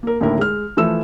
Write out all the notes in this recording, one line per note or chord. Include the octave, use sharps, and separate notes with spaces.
A#3 A#4
D#2 A2 D3 E4 A#4
G#3 F6
E3 F3 A3 E6 E7